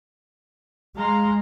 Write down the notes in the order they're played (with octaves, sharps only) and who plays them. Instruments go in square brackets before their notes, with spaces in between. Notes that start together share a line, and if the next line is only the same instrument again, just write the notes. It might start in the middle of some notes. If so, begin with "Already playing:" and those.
[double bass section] G#3 [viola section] F5 A#5 C6